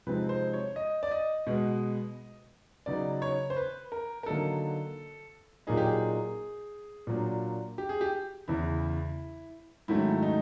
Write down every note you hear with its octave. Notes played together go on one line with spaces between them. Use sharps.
C3 F3 G#3 C4 D#4 B4
C5
C#5
D#5
D5
D#5
B2 G#3 B3
C#3 F#3 B3 D#4 D5
C#5
C5
B4
A#4
A#4
D3 F#3 A#3 D#4 A4
A#2 F#3 A#3 D#4 G#4
G4
G#4
A#2 F#3 A#3 D4
G4
G#4
G4
E2 C#3 E3 E4
G#2 D#3 F#3 A3 C#4 E4
D#4